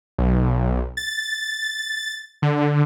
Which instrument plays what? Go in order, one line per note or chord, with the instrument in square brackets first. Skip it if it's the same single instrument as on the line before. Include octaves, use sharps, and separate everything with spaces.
[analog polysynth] B1
A6
D3